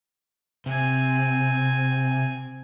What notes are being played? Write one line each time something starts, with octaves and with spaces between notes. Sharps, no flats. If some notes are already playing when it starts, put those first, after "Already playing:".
C3 C4 G#5